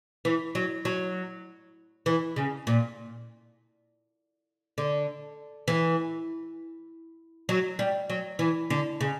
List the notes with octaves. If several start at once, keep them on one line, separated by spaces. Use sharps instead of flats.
E3
F#3
F#3
E3
C#3
A#2
D3
E3
F#3
G3
F#3
E3
D3
C#3